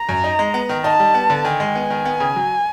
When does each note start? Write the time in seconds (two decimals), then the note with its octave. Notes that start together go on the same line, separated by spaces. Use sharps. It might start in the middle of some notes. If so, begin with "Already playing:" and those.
Already playing: A#5
0.09 F#2
0.24 D#4
0.39 G#3
0.54 B3
0.69 D#3
0.84 D#4 A5
0.99 G3
1.15 B3
1.30 D3
1.44 D#3 G#5
1.60 G#3
1.75 B3
1.90 D#3
2.05 B3
2.20 C#3
2.36 F#3